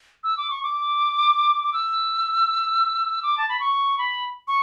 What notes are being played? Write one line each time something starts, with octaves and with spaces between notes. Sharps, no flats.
E6
D6
C#6
D6
D6
E6
D6
A5
B5
C#6
B5
C#6